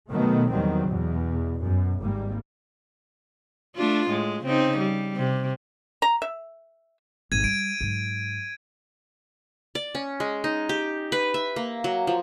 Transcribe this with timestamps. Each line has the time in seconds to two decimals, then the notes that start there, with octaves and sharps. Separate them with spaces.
0.11 B2 D#3 F#3 A3 B3
0.49 E2 D#3 F#3 G3 C4
0.88 E2 B2
1.61 F#2 B2
1.99 G#1 G3 A#3
3.76 A3 D4 F4
4.09 A2 G#3
4.44 C#3 C4 D#4
4.79 G3
5.16 C3
6.02 A#5
6.22 E5
7.32 G#1 A#2 G#6 D#7
7.44 G3 D7
7.81 G#2 F#3
9.75 D5
9.95 C#4
10.20 G#3
10.44 D#4
10.69 G4
11.12 B4
11.34 E5
11.56 A#3
11.84 F#3
12.07 F3